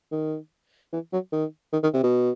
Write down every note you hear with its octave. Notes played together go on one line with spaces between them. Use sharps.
D#3
E3
F#3
D#3
D#3
D#3
C3
B2